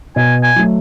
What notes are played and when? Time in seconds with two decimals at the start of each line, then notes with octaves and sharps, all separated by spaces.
0.16 B2 G#5
0.43 G#5
0.56 F#3 A3